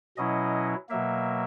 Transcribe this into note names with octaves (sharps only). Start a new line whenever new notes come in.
B2 F#3 C#4 E4 D#5
B2 F#3 A#3 E5